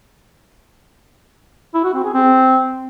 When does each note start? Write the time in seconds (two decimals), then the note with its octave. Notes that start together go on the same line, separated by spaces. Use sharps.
1.74 E4
1.84 F#4
1.94 C4
2.04 G#4
2.14 C4